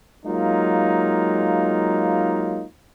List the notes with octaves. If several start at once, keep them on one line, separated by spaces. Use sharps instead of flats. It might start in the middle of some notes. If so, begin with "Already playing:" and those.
F#3 G#3 A#3 D#4 F4